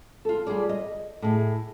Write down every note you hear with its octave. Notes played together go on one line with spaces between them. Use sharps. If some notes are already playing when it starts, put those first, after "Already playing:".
F4 A4
G3 F4 G4 G#4 D5
D#5
A2 G#4